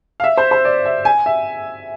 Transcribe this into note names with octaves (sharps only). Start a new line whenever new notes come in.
F5
E5
C5
C5
D5
E5
G#5
E5